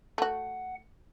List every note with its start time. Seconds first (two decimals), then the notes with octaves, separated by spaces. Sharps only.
0.18 A3 F#4 F#5